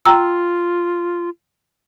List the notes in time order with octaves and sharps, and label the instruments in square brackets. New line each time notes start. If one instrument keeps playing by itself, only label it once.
[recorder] F4 [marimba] G5 A#5 E6